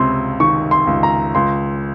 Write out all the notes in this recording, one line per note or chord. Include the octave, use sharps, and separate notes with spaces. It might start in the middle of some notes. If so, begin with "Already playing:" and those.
Already playing: C#2 C3 C6
D#3 C#6
C6
C#2
A#5
C#2 C6